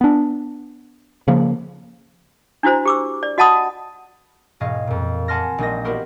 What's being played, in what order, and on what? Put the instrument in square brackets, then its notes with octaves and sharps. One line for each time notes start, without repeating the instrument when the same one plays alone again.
[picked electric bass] B3 D4
C#3 F3 A#3
[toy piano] D4 E4 F#4 C5 A#5
G4 D6 E6
D5
F#4 D#5 F#5 A5 B5 D#6
[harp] E1 G#2 D#5 F5 C#6 G#6
F2 A#2
F#5 G#5 A5 C6 F6 A#6
A#1 G3 D#4 D#5 A#6
B3 E4 F#4 G4 A#4 C5